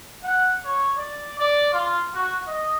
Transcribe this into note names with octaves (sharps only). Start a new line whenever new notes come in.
F#5
C#5
D5
D5
F4
F#4
D#5